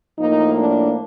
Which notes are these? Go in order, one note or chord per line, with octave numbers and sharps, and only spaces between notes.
A2 F3 A#3 D#4
D4